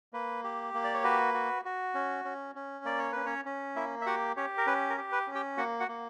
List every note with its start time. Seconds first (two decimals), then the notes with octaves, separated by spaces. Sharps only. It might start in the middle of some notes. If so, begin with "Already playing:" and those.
0.13 A#3 B4
0.44 G4
0.74 A#3
0.84 D5
0.94 C#5
1.04 F#4 B4
1.34 F#4
1.65 F#4
1.95 C#4
2.25 C#4
2.55 C#4
2.85 A#3 D5
2.99 C#5
3.12 C#4 B4
3.26 C#4 C#5
3.46 C#4
3.76 A#3 E4 E5
4.01 E5
4.06 F#4 G4 F#5
4.36 C#4 G4 C#5
4.58 A#4
4.67 C#4 B4
4.90 A#4
4.98 G4
5.12 B4
5.27 C#4
5.35 G4 G5
5.57 A#3 F#4 F#5
5.80 F#4 F#5
5.88 A#3